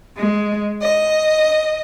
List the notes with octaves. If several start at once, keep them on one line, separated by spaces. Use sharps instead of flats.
G#3
D#5